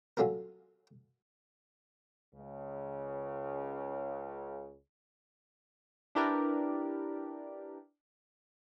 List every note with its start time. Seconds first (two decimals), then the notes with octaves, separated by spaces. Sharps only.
0.17 F#3 C#4 F4 A4 A#4
2.35 C#2 C#3
6.15 D4 E4 G4 A#4 B4 D5